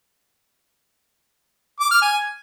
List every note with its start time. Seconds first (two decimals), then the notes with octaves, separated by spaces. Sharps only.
1.81 D6
1.91 F6
2.02 G#5